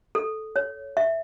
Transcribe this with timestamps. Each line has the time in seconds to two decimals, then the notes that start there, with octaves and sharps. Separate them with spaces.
0.15 A4
0.56 C#5
0.97 E5